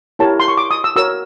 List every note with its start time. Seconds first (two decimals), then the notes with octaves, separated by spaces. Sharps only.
0.19 E4 G4 A#4 C#5 A5
0.40 C6
0.48 C#6
0.57 D6
0.71 D#6
0.84 E6
0.96 F#4 A#4 C#5 E6